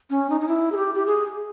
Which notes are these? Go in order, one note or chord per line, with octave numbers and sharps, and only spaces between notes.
C#4
D#4
D#4
E4
G#4
G4
G4
G#4